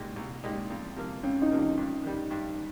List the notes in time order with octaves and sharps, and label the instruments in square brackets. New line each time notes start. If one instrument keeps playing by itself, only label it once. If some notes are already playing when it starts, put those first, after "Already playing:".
Already playing: [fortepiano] C2 A#2 G#3 D#4 G4
C2
A#2 G#3 D#4 G4
F2
C3 F3 A#3 F4
[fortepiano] F2 [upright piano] C#4
[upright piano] D#4
[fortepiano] C3 F3 A#3 F4
[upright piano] D#4
[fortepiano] G2
D#3 G3
G2